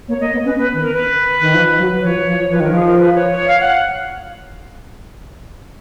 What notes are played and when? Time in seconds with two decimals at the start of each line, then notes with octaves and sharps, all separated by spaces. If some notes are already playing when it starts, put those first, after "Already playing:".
0.08 A#3 C#5
0.21 A#3 D#5
0.33 B3
0.45 C#4 B4
0.57 B3 B4
0.73 D#3
0.80 A#4
0.93 B4
1.40 D#3
1.54 F3
1.78 F#3
2.02 F3 C#5
2.26 F3
2.51 F3 B4
2.60 D#3 A#4
2.71 F3 G#4
2.86 A#4
2.98 B4
3.14 C#5
3.31 C#5
3.48 F5
3.60 F#5